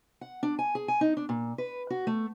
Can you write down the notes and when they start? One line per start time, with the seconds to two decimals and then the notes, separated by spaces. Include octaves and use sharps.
0.21 F#5
0.43 D4
0.59 G#5
0.75 G#4
0.88 G#5
1.01 D#4
1.17 D4
1.29 A#2
1.58 B4
1.90 F#4
2.07 A3